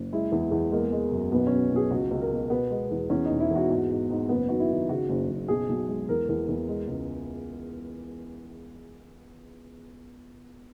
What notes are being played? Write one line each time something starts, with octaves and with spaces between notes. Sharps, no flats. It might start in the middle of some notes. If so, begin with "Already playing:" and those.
Already playing: F#1
G#3 E4
E2
E2
G#3 A#3
G#3
F#2
B1 B3
C#4
B2
B1 G#4
C#2 F#4
C#2
A#4
B2
B2 B3
G#3
E2
E2 C#4
D#4
E1
E4
E2 F#4
G#2 F#4
G#2
G#2
F#1 B3
D#3 F#4
E4
D#3
C#3 F#4
F#1
F#1
B1 G#4
B1
G#3
E2 A#4
E2
E2
G#3
C#2